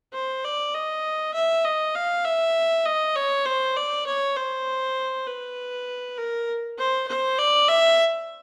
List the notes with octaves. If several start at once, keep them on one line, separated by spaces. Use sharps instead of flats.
C5
D5
D#5
E5
D#5
F5
E5
D#5
C#5
C5
D5
C#5
C5
B4
A#4
C5
C5
D5
E5